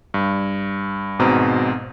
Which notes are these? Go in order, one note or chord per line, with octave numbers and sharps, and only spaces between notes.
G2
G#1 G#2 B2 C4 A#5